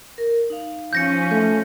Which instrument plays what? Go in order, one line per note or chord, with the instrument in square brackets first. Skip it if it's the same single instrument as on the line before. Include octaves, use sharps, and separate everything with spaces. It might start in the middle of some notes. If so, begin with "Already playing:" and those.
[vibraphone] A#4
D#4 F5
[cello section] F3 C#4 [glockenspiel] G6 A#6 C#7
[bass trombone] A3 [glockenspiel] G6